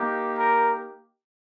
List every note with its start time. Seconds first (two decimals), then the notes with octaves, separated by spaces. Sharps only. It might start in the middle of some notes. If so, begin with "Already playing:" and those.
Already playing: A#3 D#4 G4
0.37 A#4